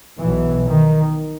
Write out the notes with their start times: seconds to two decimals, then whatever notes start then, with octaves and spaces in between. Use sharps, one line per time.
0.19 B1 B2 E3
0.68 D#3